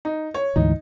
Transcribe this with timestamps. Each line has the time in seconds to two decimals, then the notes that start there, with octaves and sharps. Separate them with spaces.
0.05 D#4
0.34 C#5
0.56 D2 G#2 E3 D#4